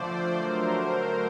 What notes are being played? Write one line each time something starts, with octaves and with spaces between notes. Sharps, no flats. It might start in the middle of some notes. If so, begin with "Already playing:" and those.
Already playing: D3 F3 A3 C5 D5
D3 F#3 A3 A#4 C5